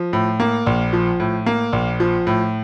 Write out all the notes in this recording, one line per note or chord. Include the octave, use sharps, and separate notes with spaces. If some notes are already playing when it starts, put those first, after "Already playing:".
Already playing: F3
A2
A#3
A#1
F3
A2
A#3
A#1
F3
A2